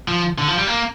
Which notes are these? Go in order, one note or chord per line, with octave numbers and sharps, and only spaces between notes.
F3
D3
F3
G3
A#3